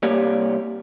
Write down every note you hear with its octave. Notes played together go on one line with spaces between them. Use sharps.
C2 A#3 G4 C#5 D5